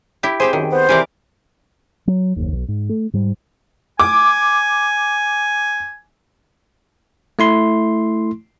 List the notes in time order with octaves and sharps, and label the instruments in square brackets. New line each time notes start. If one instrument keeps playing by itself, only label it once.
[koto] E4 G4
[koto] C4 G4 G#4 [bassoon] C5
[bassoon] F#2 [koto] D#3
[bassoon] B3 [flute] C5
[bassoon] C3 [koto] E3 A#4 D5
[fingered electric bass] F#3
F#1 D#2
B1
G#2
A3
G#2 G3
[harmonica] G#5 [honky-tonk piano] D6
[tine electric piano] A3 E4 C6